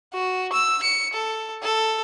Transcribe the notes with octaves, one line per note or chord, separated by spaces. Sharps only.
F#4
E6
C#7
A4
A4